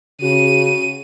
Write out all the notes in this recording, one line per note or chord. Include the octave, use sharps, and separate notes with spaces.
C#3 F#4 D#7